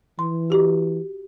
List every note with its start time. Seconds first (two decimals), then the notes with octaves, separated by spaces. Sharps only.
0.19 E3 C6
0.50 F#4 G4